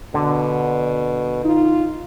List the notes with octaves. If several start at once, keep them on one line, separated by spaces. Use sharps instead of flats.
B2 D3
D#4 F4